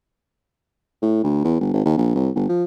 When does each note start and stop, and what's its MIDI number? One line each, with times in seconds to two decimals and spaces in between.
1.02 1.19 45
1.24 1.42 38
1.44 1.56 40
1.60 1.71 31
1.73 1.84 32
1.85 1.96 39
1.97 2.11 34
2.15 2.30 36
2.35 2.44 31
2.49 2.64 53